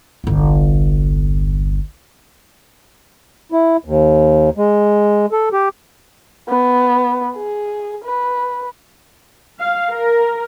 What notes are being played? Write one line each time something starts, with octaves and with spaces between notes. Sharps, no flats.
G1 C2
E4
D#2
G#3
A4
G4
B3
G#4
B4
F5
A#4